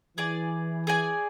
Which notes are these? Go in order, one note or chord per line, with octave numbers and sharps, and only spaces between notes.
E3 G#4 D5 G#5
G#4 D5 G#5